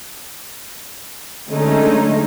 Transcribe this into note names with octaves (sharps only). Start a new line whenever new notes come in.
D3 F#3 G#3 A3 C#4 D#4